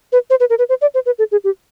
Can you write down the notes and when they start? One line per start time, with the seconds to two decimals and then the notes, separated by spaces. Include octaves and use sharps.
0.12 B4
0.30 C5
0.40 B4
0.50 A#4
0.59 B4
0.69 C5
0.81 D5
0.94 C5
1.06 B4
1.19 A4
1.32 G#4
1.44 G4